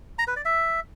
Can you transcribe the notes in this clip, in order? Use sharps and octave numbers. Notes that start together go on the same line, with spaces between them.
A#5
B4
D5
E5